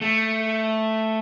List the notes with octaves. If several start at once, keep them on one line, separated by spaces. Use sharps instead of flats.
A3